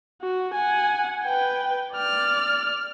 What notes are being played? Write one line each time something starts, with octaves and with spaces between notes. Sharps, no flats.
F#4
F#5 G#5
B4 G5
D5 F6